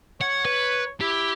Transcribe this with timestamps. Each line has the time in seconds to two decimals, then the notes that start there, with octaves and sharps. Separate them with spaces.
0.21 C#5 F#5
0.45 B4
1.01 E4 G4